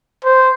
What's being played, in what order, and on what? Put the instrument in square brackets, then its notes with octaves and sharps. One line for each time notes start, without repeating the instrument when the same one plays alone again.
[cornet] C5